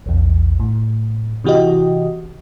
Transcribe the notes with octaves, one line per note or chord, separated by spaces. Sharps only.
A#1 E2
A2
C3 E3 F#4 G4 D#5